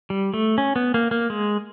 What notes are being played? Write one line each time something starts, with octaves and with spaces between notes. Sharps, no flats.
G3
A3
C#4
B3
A#3
A#3
G#3